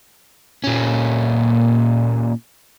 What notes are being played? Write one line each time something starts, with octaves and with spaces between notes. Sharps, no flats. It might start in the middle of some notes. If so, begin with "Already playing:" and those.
A#2 C#4